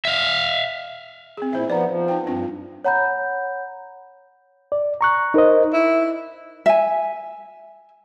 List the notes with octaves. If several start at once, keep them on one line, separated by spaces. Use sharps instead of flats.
E5 F5
C4 G#4
A#2 E4 C5 E5
F3 B3 D#4 D5 A#5
F3
D#4 G5
G2 C4 D4 F4
C#5 F#5 A#5 B5 G6
D5
A#5 C#6 F#6
D#4 A#4 C5 D#5
E4
E5 G#5